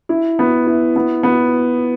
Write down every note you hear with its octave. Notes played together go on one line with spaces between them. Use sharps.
E4
B3
E4
B3
B3